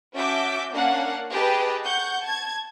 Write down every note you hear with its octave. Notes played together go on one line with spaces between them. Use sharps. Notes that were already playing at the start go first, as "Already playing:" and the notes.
C#4 F#4 E5 A5 D6 G6
A#3 C#4 D4 F5 F#5
G4 G#4 B4 D#5 G5 A5
F#5 C#6 G6
A5 G#6